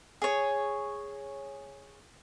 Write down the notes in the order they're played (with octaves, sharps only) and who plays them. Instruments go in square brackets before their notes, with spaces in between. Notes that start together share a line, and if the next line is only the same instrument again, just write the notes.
[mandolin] G#4 C#5